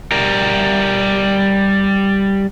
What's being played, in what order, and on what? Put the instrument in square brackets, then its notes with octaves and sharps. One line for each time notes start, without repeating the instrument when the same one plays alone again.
[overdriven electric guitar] G3 A#4